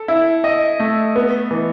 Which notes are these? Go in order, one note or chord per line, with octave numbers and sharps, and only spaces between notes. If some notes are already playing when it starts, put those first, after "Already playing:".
Already playing: A4
E4
D#5
A3
B3
E3